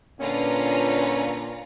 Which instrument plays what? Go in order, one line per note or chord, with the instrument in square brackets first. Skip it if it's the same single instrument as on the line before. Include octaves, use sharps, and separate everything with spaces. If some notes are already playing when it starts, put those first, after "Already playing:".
[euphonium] A#2 [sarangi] D3 [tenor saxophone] C#4 [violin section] F4 B4 A#5